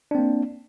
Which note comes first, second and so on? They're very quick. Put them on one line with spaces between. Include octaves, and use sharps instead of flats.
D4 C4 A#3